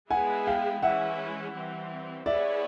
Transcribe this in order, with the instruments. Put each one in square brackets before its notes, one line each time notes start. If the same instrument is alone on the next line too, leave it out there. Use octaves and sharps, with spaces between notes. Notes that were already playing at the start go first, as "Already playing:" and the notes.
[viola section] G#3 B3 E4 G#4 [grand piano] F#5 G#5
[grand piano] F5 G5
[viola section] E3 G#3 C#4 E4 [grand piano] E5 F#5
[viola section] E3 G3 C4
[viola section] B3 E4 G#4 C#5 [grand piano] D5 E5